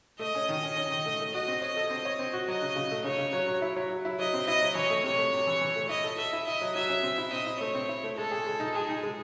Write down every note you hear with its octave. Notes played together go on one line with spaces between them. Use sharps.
A3 D#5
C#4
D#3
C#4
C#4
D#3
A3
A3
F#4 D#5
C4
C#5 D#5
A4
C4
C#5
C4
F#4
F#3 D#5
C#3
C#3
A3
C#3 C#5
C#3
F#3
F#3
E4
F#3
F#3
E4
F#3 D#5
C4
E4 D#5
F#3
E3 C#5
A3
C3 C#5
A3
C3
E3
E3
A3
E4 D#5
A4
A4 E5
E4
E4 D#5
F#3
F#3 E5
C#4
C4
E4
C4 D#5
E4
A3 C#5
C4
E4
A3
G#3 A4
G#4
G#3
D#4
G#3 G#4
D#4
G#3